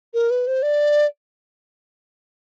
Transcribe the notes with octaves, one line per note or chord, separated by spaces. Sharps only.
A#4
B4
C5
D5